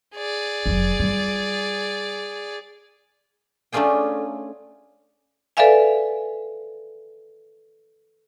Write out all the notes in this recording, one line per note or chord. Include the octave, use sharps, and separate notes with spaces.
G#4 D5
F1 F#3
G3 F4
A3 C#4 D4 F4 G#4 G5
A4 B4 D5 E5 F5 G#5